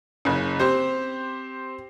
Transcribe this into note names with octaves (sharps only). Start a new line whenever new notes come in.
F#1 C#3
C4 G4 C5